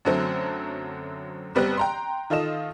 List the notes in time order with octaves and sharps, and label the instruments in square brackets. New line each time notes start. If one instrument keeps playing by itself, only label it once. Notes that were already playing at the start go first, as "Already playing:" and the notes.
[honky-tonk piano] F#2 D3 F#3 A3 C4
F#1 G3 B3 C4 F#6
G5 A#5 C6
D#3 F4 A4 D#5 E7